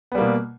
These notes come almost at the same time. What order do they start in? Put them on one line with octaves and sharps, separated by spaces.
B3 G3 A#3 B2